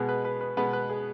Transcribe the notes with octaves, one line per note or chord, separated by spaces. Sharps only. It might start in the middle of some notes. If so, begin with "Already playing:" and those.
Already playing: B2 G#3 B3 G#4
B4
B4
B4
B2 G#3 B3 B4
B4
G#4